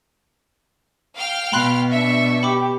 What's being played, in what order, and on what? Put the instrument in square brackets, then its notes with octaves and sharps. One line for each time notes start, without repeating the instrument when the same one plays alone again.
[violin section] F5 G5 F6
[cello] B2 [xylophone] B5 C6 F#6
[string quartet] D4 C#6 [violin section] E5
[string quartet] G4 [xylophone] B5 D6